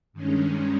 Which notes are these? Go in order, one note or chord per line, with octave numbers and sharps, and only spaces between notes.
G2 D#3 G#3 C#4